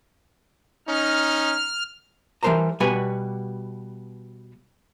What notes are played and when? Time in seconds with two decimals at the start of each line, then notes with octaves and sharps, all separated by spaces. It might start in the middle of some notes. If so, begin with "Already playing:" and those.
0.88 C#4 D#4 F6
2.43 E3 G3 A#4 C5 A5 A#5
2.80 B2 G3 F#4 B4 G#5